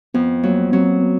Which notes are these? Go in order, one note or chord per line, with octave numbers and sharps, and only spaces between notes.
F2 B3
F#3 A#3
F#3 C4
B3